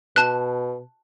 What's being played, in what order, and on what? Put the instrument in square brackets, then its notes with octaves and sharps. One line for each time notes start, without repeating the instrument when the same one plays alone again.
[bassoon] B2 [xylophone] A5 F#6